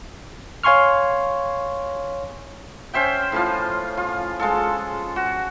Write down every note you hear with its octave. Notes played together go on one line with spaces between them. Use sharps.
C#5 F5 G#5 C6 C#6 F6
C#4 C5 E5 G5
A2 F3 F4
F4
G#3 F4 A4
F#4